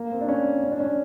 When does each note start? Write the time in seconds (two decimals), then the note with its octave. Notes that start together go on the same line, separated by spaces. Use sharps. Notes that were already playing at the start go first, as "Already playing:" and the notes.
Already playing: A#3
0.12 C4
0.21 D4
0.28 C#4
0.63 C#4
0.71 D4
0.80 C#4